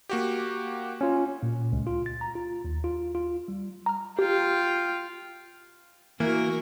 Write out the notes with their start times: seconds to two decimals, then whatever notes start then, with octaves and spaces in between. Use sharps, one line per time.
0.09 A#3 F#4 G4
1.01 C#4 F4
1.43 A#2
1.72 C#2
1.87 F4
2.06 A6
2.21 A#5
2.35 F4
2.64 D#2
2.84 F4
3.15 F4
3.48 G3
3.86 A#5 F6
4.19 F4 G4 G5
6.20 E3 A#3 F#4 A#4